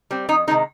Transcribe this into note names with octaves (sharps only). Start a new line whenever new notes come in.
G3 C4
F2 D#4
C3 D#3 G#3 D#4